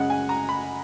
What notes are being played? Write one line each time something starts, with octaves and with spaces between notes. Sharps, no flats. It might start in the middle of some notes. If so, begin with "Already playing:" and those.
Already playing: F#2 C#3 G#3 F#5
G#5
A#5
B5